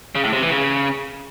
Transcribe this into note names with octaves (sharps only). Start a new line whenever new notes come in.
C#3
A2
C3
E3
C#3